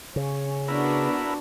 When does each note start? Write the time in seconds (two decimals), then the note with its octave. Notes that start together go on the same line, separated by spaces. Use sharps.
0.16 C#3 C#4
0.68 B3 D4 E4 F#4 A#4 B4